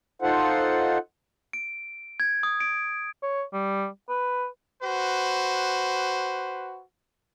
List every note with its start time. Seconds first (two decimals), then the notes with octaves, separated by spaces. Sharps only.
0.22 D#4 F4 A4 C5 F#5
1.53 D7
2.20 G#6
2.43 D#6
2.60 D7
3.23 C#5
3.53 G3
4.09 B4
4.82 F#4 B4 C5